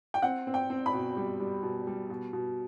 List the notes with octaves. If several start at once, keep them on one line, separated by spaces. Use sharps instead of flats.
G5
C4 F#5
C4
G5
C4
B5
B2
G3
G3
B2
G3
B2
B2